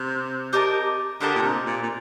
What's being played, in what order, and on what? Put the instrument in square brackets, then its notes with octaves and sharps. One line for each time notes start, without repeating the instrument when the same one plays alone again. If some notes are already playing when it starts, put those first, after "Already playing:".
Already playing: [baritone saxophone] C3
[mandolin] G4 A#4 D#5 A5
[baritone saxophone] D3 [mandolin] G4 A#4 D#5 A5
[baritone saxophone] A#2
C3
A#2
A#2